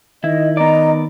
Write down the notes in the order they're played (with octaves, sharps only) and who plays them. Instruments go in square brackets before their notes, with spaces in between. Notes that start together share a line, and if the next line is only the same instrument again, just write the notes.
[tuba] D#3 [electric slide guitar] E4 [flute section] D#5
[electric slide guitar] B3 D5 [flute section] D#5 A#5